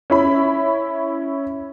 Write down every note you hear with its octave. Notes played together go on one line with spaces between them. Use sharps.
C#4 E4 B5